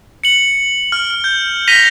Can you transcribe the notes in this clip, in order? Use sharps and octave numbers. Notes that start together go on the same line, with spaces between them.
C#7 F#7
F6
G6
A#6 B6 D#7 F7 G7